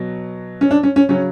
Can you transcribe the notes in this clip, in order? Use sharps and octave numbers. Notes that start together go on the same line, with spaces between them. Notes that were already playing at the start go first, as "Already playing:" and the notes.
Already playing: B2 F#3
C#4
D4
C#4
C#4
C#3 F#3 C#4